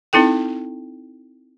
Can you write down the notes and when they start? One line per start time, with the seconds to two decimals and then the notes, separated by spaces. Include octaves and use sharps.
0.13 C4 D#4 E4 A4 G5